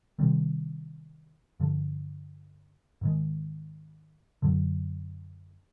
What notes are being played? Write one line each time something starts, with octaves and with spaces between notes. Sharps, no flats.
C3 D#3 G3 C4
G2 D3 F3
G#2 D#3 G#3
F#2 D3 F#3